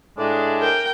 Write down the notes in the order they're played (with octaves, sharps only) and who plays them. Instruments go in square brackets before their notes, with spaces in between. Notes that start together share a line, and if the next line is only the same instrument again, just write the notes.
[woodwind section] A2 G#3 D4
[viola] A#4 G5